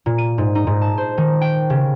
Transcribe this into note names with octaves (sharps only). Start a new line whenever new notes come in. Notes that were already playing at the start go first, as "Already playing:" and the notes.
A#2
D#7
G#2
D#4
G#2
A5
C5
D#3
G5
C#3